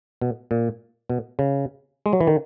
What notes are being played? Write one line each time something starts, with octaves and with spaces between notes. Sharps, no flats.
B2
A#2
B2
C#3
G#3
F#3
E3
D#3